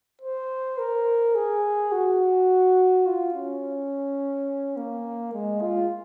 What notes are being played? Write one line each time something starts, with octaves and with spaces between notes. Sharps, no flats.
C5
A#4
G#4
F#4
F4
C#4
A#3
G#3
F4